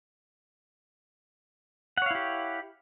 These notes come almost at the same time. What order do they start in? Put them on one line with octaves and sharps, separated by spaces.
F#5 C#5 F5 E4 G4